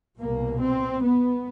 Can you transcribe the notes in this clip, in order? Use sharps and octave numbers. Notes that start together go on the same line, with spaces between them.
C2 B2 A#3
C4
B3